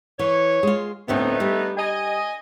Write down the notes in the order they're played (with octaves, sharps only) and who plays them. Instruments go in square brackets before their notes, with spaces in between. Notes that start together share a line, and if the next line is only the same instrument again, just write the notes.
[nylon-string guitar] E3 [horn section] C#5
[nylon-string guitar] G#3 F4
[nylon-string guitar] D2 A2 C4 [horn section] A3 B3 D#4
[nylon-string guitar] G3
[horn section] D#5 G#5